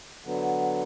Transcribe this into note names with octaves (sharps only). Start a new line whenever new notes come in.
D3 F#3 B3